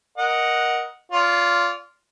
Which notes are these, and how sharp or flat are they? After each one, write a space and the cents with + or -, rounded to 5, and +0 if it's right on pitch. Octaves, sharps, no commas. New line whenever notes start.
A#4 +25 D#5 +0 F#5 +0
F4 +0 D5 -40